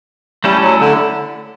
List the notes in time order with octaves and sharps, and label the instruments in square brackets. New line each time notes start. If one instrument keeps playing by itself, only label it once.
[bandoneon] G3 [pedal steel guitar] A3 C#4 E4 A4
[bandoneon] F#3
D3